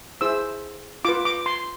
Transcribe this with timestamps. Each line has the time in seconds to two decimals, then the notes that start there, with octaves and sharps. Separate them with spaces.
0.21 E4 G#4 C5 E6
1.05 F4 B4 D6
1.25 D6
1.46 C6